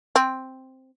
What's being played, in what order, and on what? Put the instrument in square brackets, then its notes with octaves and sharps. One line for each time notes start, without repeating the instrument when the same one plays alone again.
[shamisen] C4